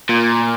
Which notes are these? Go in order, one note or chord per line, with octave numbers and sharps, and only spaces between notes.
A#2